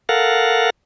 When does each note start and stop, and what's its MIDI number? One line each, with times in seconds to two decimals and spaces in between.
0.09 0.70 69
0.09 0.70 70
0.09 0.70 77
0.09 0.70 78